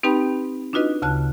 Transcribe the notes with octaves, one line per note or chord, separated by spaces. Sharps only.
C4 D#4 G4 B4 G5 B5
D4 D#4 F4 F#4 B4 D#5
D2 C#3 A5 F6 F#6